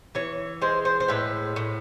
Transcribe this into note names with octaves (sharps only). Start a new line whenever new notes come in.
E3 C#5
G#3 C5
C5
C5
A2 B4
A2